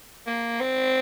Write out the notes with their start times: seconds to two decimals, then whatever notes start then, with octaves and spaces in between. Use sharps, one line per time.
0.27 A#3
0.60 C4